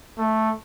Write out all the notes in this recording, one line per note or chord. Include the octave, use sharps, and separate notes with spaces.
A3